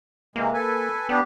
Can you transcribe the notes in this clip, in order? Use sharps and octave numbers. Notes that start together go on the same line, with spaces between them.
C3 E3 G#3 A#3
A4 B4 G#5
B3 D4 G4